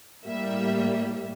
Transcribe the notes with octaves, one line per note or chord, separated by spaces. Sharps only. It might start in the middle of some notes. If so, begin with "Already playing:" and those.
A2 G3 A#3 E5